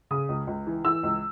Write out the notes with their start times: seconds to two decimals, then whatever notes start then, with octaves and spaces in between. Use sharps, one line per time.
0.11 C#3 D#6
0.29 C#2
0.47 C#2
0.67 E3
0.84 E3 E6
1.03 C#2